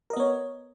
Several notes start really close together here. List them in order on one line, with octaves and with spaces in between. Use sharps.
A#4 D#5 B3 C#5